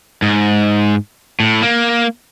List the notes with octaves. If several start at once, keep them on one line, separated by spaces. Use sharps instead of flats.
G#2
A2
A#3